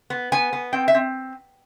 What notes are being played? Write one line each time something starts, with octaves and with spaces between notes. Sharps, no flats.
B3
B3 G#5
B3
C4 G5
E5
C4